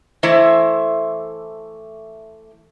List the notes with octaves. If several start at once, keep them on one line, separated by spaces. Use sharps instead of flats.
E3 A3 E4 C5